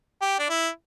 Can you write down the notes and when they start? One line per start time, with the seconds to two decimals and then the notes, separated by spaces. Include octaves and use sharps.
0.21 G4
0.39 D4
0.49 E4